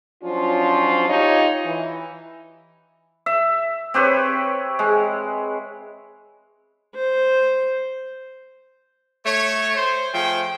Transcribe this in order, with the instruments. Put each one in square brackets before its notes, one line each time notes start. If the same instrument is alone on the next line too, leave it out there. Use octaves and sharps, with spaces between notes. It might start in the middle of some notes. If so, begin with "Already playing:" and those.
[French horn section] F3 F#3 C#4 D4 F4
D#4 F4 G4 C#5
E3
[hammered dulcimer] E5
C4 G4 B4 C#5
G#3
[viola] C5
[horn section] A3 C#5
C5
F3 A3 G#4 G5